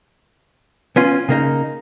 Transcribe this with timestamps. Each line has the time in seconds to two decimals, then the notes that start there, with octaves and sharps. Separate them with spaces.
0.96 B3 C#4 F4
1.29 C#3 A#3 D#4